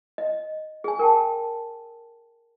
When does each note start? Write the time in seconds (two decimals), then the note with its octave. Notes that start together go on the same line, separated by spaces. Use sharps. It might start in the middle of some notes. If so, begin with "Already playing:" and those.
0.18 D#5
0.84 G#4 G#5
0.99 A#4 G5 A5